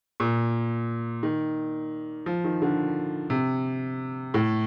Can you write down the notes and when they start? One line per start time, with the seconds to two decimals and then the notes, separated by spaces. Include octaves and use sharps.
0.20 A#2
1.23 D#3
2.26 F3
2.44 D#3
2.62 D3
3.30 C3
4.34 A2